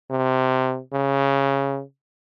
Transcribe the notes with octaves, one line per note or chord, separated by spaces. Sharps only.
C3
C#3